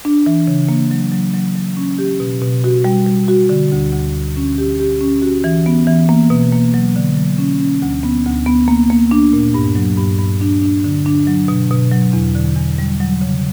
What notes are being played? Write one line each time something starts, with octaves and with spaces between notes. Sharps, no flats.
D4
E3
C#3
A#3
F#3
F#3
F#3
F#3
C#4
G4
B2
B2
F#4
G3
G3
F#4
D3
D2
D2
D2
C#4
G4
G4
C#4
F#4
E3
B3
E3
A#3
B2
A#3
F#3
D3
F#3
C#4
C#4
D2
B3
D2
B3
A#3
A#3
D4
A#2
G2
F#3
G2
G2
D4
D4
D3
D4
F#3
B2
B2
F#3
E2
D3
E2
G3
F#3
C#3